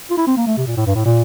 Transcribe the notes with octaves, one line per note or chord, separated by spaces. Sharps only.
F4
E4
C4
A#3
A3
C3
A#2
A2
G2
A2
A#2